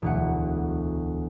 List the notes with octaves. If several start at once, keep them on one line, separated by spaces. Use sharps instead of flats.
E1 D2 F#5